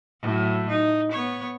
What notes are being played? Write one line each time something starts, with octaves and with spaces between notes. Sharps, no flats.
A2 F#3
D#4
B3 C#5